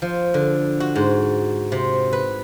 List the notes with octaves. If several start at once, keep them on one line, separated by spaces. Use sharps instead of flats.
F3
D3
F#4
G#2
C3
B4